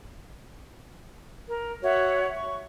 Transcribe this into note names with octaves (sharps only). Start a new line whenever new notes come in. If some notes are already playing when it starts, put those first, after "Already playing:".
A#4
F#4 C#5 E5 F#5
C#6